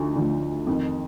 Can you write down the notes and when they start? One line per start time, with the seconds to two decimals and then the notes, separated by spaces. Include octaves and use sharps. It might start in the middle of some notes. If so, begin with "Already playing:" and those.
Already playing: D2 D3 F3 D#4
0.16 D2 D3 F3
0.67 F2 D#3